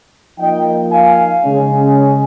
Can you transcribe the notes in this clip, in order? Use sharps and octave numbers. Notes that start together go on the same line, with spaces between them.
F3 A#3 D#4 D#5 G5
F5 G#5
C#3 G#3 C#4